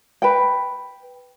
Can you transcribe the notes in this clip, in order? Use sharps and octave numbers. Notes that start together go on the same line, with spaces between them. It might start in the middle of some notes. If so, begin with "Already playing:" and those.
B4 G5